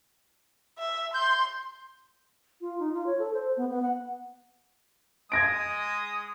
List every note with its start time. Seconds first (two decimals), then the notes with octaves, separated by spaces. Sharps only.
0.78 E5
1.14 C6 G6
2.61 F4
2.80 D#4
2.93 F4
3.06 C#5
3.19 A4
3.34 C5
3.57 B3
3.70 B3
3.82 F#5
5.32 G#3 D#6 G#6 A#6 D7